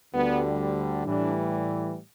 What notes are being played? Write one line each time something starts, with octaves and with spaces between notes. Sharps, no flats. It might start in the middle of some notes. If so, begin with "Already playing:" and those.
D2 D3 G3 B3
A2 E3 G3 D4